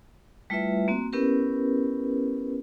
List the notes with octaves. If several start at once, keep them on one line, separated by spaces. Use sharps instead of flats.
G3 A3 E4 F4 B4 E5
A#3 C4 F#4
B3 C#4 E4 G4 A#4 B4